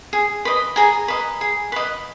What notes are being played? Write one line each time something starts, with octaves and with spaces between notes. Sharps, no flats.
G#4
B4 D#5
G#4 G#5 A#5
B4 D#5
G#4
B4 D#5